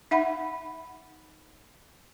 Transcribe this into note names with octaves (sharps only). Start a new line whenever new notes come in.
D#4 E5 F#5 B5